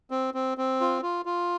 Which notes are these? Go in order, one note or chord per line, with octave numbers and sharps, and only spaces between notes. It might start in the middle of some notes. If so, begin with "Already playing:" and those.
C4
C4
C4
F4
F4
F4